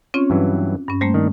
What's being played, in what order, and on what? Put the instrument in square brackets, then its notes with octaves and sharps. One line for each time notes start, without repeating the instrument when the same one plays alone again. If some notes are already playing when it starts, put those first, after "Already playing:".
[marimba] C4 C#4 F4 [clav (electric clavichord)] C#5
[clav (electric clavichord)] G2 E3 F#3
[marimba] G2 C#4
[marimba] G3 A3 A#3 [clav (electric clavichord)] C5
[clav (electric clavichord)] D#3 D4